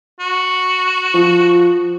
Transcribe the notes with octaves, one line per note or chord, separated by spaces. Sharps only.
F#4
F3